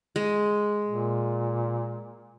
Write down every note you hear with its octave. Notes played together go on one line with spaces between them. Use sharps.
G#3
A#2